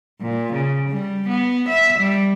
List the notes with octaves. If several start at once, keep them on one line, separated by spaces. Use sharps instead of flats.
A#2
C#3
G3
B3
E5
G3